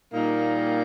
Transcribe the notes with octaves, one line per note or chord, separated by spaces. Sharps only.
A#2 G3 A#3 D#4